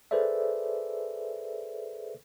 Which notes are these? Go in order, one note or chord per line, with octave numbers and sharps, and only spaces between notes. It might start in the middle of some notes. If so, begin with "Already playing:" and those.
G#4 A4 B4 C5 D5 E5